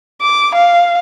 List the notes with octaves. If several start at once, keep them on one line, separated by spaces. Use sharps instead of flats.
D6
F5